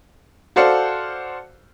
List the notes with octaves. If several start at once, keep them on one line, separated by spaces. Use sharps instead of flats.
F#4 A4 C5 D5 F5 F#5